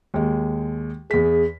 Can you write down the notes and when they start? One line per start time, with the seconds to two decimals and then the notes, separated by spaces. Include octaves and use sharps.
0.14 D#2 G#3
1.11 E2 G#4 B6